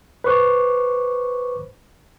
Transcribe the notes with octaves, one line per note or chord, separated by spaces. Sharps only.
B4 C5 C#6 D6